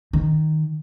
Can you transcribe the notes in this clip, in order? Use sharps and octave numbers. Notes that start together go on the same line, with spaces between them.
D#3